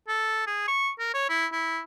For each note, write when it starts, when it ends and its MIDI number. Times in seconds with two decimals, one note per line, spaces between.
0.08 0.43 69
0.47 0.64 68
0.68 0.90 85
0.99 1.11 70
1.14 1.25 73
1.30 1.46 64
1.52 1.81 64